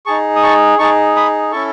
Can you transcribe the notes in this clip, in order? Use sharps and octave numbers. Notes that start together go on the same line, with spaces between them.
D#4 G#4 A5 C#6
D#6
A5 C#6
D#4 G#4 A5 C#6
B5 D#6
C#4 E4 A4 A5 C#6